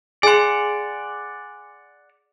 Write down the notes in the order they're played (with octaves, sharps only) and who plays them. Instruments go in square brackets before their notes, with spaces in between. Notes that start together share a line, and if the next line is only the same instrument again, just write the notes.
[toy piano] G#4 [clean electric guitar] D5 F#5 [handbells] G#5 C6